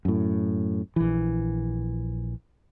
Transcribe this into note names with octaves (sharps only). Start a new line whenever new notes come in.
F#2 A2
A#1 E3